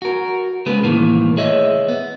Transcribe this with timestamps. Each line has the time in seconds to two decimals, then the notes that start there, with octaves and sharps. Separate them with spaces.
0.02 F#4 A#4
0.66 C#3 G#3 B3 B4
0.83 C2 A2 D#3 E3 A#3
1.37 G#4 C#5 D#5 E5
1.88 B3